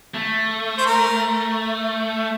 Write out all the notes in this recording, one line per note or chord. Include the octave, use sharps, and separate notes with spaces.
A3
C5
A#4